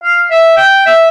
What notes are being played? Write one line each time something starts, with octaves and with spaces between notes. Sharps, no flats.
F5
E5
G5
E5